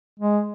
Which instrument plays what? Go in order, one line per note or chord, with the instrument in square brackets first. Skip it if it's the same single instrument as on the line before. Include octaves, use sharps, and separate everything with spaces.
[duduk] G#3